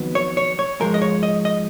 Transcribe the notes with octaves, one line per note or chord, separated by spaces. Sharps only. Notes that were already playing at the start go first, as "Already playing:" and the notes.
Already playing: F2 D#3 F#3 B3
C#5
C#5
C#5
G#2 F3 G#3 A#4
D#5
C#5
D#5
D#5